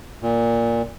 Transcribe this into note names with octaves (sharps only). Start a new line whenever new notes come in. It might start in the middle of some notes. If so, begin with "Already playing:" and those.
A#2